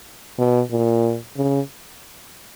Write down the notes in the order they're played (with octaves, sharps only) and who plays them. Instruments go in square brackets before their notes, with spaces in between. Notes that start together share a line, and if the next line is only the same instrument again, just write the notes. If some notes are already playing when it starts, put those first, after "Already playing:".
[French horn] B2
A#2
C#3